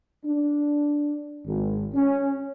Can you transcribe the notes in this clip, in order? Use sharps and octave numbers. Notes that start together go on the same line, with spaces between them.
D4
G#1
C#4